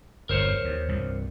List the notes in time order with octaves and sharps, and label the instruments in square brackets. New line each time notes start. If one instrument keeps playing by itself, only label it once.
[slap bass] G1 E2 [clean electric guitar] A#4 C5 C#5
[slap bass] D#2
C2 G2